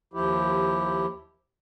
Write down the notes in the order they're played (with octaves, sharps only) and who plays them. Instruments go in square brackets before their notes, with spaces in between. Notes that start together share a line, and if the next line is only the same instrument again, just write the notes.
[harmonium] D#2 F3 E4 G4